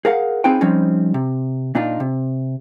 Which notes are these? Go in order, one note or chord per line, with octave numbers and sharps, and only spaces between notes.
G#4 A#4 F5 F#5
C4 D#4 F4 G#4 B4 G5
F3 G3 C4 C#4 D#4
C3
A#2 D4 D#4 F4
C3